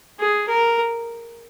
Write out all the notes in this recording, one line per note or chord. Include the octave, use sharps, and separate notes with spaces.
G#4
A#4